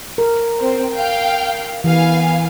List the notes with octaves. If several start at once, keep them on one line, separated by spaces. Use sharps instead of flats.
A#4
C4
F5 G5
E3 B3 F5 G#5